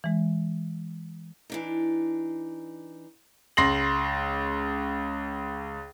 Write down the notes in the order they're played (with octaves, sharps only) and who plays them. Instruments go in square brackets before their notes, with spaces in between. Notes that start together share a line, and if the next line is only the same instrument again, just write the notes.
[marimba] E3 G#3
[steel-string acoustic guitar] E3 D4 D#4
[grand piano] C#2 C6 A#6 C7 F#7